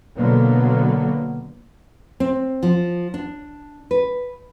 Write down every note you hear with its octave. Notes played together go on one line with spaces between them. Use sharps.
B2 D3 F#3 A#3 B3
C4
F3
D4
B4